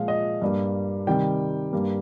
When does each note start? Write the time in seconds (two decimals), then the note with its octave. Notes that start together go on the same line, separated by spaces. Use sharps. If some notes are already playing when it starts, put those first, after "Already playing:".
Already playing: A#2 F3 G#3 F5
0.08 D#5
0.42 G2 G3 A#3
1.07 C3 D#3 G3 G5
1.73 G2 G3 A#3